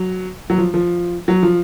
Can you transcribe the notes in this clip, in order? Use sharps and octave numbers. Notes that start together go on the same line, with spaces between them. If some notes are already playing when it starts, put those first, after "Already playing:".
Already playing: F#3
F#3
F3
F3
F#3
F3